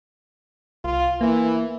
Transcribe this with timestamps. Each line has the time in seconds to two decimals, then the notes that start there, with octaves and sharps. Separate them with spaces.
0.85 C2 F4
1.21 E3 A#3